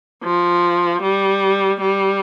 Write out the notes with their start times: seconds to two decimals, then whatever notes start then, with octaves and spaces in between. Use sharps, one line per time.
0.23 F3
1.02 G3
1.81 G3